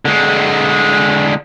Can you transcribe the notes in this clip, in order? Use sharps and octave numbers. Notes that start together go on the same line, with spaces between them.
D3 G#3